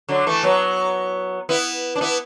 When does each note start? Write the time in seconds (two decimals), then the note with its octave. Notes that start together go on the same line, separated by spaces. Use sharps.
0.09 D3 F#3
0.27 E3 A3
0.43 F#3 B3
1.49 B3 E4
1.96 D4
2.01 B3 E4